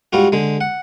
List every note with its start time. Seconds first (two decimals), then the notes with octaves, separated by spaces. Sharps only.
0.13 G#2 G3 F4 F#4
0.32 D3 G#3
0.61 F#5